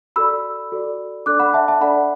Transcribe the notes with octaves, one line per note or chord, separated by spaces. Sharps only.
F#4 A4 D5 B5 E6
F#4 A4 D5
D4 A4 D5 D6 F#6
F#5 B5
E5 A5
E5 A5
D4 A4 D5 F#5 B5